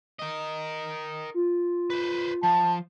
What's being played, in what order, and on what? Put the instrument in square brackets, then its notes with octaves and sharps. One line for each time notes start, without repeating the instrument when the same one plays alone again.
[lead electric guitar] A#4 D#5
[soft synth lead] F4
[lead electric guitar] B4 C5
[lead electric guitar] F3 [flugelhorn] A5